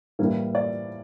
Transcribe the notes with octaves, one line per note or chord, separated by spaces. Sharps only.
A2 E3 G3 A#3
D5